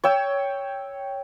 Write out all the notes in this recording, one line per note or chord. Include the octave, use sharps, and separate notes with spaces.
C#5 G5 E6